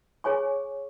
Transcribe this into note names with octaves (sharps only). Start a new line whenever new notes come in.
G#4 C#5 G#5 C#6